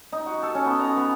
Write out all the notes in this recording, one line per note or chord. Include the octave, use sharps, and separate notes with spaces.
D#4
F#4
A4
C#4
B3
A#5
B3